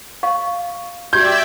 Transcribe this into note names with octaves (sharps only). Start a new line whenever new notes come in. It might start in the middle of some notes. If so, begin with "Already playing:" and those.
D#5 F5 C#6
F#4 G4 D5 E5 G5 G6 G#6